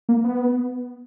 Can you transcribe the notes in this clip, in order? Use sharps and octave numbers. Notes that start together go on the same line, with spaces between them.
A#3
B3